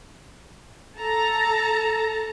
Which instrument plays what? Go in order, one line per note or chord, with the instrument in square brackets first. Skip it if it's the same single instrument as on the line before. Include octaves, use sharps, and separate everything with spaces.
[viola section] A4 A5 A#5